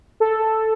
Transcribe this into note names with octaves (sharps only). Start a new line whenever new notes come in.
A4